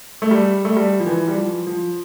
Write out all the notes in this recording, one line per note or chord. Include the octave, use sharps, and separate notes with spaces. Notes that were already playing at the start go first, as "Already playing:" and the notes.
A3
G3
A3
G3
F3
E3
G3
F3
F3